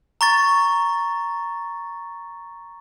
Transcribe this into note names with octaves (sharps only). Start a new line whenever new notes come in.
A#5 C#6 A6